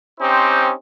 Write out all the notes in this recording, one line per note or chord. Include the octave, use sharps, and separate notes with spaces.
C4 C#4 D#4 G4 C5